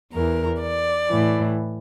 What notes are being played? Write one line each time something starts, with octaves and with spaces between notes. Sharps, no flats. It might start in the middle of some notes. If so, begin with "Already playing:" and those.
E2 E3 A#4
D5
A2 E3